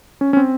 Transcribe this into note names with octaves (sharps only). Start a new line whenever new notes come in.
C#4
C#4
C4